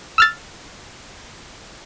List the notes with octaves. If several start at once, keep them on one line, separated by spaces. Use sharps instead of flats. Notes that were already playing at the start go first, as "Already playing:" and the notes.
E6 F6 A6